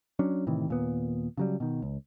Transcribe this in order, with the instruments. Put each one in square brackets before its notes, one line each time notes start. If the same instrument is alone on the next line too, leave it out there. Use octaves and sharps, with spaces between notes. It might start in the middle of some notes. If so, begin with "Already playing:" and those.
[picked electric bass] F#3 C#4 D4
A2 C3 D#3 E3
D#2 A#2 B3
C#3 F#3 G3
B2 D#3
C#2